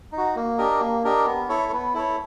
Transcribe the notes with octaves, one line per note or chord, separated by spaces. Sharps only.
D#4
F#4
A#3
D4 G4 A#4 D#5
A#3
D4 G4 A#4 D#5
B3
E4 A4 C#5
B3
E4 A4 C#5